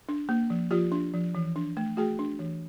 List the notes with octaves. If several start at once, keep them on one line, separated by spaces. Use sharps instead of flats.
D4
A#3
F3
F3 F4 G4
D4
F3
E3
D4
A3
A3 F#4 G#4
D4
E3